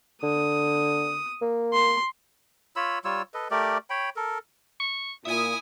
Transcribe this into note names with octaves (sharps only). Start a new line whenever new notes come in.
D3 D#6
A#3
C6
F4 C#5 B5 E6
G3 F4 C#5 E6
A4 B4 D#5
A3 G4 A#4 D5
C#5 G5 B5
A4 A#4
C#6
A#2 E4 E5 G#5 D#6